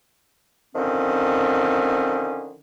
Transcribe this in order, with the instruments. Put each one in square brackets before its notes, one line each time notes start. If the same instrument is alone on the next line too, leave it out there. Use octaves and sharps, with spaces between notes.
[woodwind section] D3 D#3 F3 C4 C#4